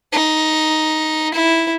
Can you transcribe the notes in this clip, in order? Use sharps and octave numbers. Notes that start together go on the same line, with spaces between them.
D#4
E4